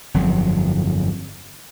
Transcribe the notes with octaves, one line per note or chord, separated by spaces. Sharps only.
G1 F2 F#3